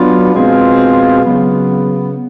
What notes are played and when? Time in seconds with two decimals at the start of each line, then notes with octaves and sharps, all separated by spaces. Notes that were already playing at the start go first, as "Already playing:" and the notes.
Already playing: F#3 B3 D4 F4
0.33 B2 G#3 C4 F4
1.24 C#3 F#3 B3